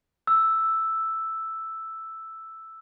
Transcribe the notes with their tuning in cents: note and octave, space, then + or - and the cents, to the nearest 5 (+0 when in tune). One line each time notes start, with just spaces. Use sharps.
E6 +0